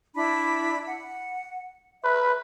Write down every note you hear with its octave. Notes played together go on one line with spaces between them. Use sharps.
D4 E4 B5
F#5
B4 E5